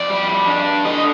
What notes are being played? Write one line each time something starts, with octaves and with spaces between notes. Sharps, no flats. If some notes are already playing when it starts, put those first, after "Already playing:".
Already playing: F2 D5
G3
D4
D3 D#5